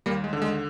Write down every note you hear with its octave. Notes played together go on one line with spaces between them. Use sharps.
D#2 G3 A#3
G#3
D3
G#3